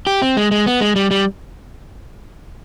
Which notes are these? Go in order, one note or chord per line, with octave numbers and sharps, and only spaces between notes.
G4
C4
G#3
G#3
B3
G#3
G3
G3